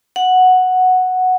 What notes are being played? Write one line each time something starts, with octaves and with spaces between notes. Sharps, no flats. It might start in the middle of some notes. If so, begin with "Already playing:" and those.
F#5